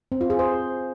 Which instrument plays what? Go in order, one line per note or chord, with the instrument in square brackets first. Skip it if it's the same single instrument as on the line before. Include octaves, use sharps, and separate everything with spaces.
[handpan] C4
F4
G#4
C5